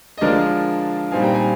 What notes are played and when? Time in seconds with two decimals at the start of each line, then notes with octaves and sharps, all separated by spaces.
0.17 D#5
0.21 D3 F3 G#3 D4 A#4 D5
1.11 A#2 G3 C4 D#4 F5 G#5
1.23 G5 A#5
1.34 F5 G#5